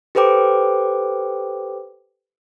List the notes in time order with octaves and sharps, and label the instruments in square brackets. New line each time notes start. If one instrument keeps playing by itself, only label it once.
[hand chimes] G4 A4 B4 C5 G5 D6